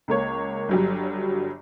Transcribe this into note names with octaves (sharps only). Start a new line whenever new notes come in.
C#2 A#3 C#5
G1 F#3 G3